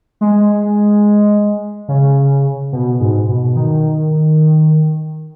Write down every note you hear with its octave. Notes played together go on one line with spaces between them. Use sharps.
G#3
C#3
B2
G#2
B2
D#3